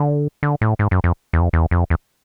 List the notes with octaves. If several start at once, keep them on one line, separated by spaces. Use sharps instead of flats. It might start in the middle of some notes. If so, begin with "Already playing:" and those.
Already playing: D3
D3
A2
G#2
F#2
F2
E2
F2
E2
F2
E2